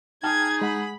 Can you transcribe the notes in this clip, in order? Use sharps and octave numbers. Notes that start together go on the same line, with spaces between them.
D#4 G#4 G5 A5 F6 G#6
G#3 F#5 B5